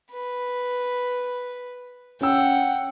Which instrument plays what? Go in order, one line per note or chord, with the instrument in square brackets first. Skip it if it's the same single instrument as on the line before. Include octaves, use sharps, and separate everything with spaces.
[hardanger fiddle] B4
[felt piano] C#4 E6 [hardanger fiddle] F#5 G5